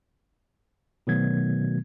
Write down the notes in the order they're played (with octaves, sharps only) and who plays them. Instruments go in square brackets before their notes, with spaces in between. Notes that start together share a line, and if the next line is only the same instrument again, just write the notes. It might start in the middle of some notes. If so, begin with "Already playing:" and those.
[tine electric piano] B2 D#3 F#3 A3 B3 G#6